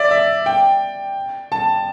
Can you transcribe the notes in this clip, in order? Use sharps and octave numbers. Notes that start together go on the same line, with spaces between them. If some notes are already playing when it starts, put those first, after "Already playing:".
Already playing: D5 E5
E5
G5
A5